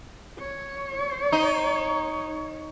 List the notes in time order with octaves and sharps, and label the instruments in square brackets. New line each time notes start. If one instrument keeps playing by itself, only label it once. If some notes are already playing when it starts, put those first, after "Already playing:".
[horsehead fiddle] C#5
[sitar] D#4